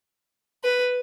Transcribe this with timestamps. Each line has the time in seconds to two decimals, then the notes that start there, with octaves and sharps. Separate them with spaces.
0.64 B4